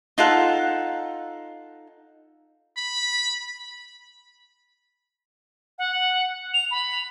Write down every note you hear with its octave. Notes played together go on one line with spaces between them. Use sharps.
D#4 F4 A4 F#5
B5
F#5
F7
B5